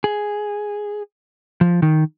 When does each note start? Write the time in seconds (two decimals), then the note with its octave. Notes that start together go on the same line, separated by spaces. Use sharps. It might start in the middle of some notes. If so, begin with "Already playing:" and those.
0.04 G#4
1.61 F3
1.82 D#3